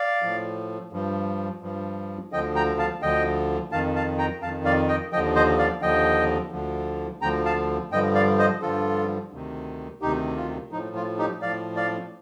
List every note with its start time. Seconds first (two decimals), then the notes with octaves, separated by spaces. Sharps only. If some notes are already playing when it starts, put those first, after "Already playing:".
Already playing: D5 F5
0.22 A2 F3
0.93 G2 F3
1.62 G2 F3
2.32 D2 D3 F3 D#5 G5
2.55 G5 A#5
2.79 F5 A5
3.02 D2 D3 F3 D#5 G5
3.72 F2 D#3 F5 A5
3.95 F5 A5
4.18 G5 A#5
4.42 F2 F5 A5
4.46 D#3
4.65 D5 F5
4.89 D#5 G5
5.12 D#2 D3 F3 D#5 G5
5.36 C5 D#5
5.59 D5 F5
5.82 D#2 D3 F3 D#5 G5
6.51 D2 D3 F3
7.21 D2 D3 F3 G5 A#5
7.45 F5 A5
7.92 G2 D3 F3 D#5 G5
8.15 D5 F5
8.39 C5 D#5
8.62 G2 D3 F3 F4 A4
9.32 D2 C3 D#3
10.01 D2 C3 D#3 D#4 G4
10.36 F4
10.72 A2 F3 D#4
10.96 F4
11.19 D#4 G4
11.42 A2 F3 D5 F5
11.76 D5 F5